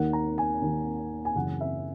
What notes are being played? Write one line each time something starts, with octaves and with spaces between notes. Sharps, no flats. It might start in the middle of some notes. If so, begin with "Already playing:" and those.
Already playing: D#2 D#3 A#3 F#5
A#5
G#5
D#2 D#3 A#3
G#5
F#2 C#3 E3 F#5
E5